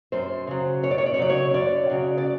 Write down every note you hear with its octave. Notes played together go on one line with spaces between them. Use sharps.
F#2 C5
C#3 F#3
F#2 C#5
D5
C#5
D5
C#5
C#3 F#3 D5
C#5
F#2 D5
C#3 F#3
D5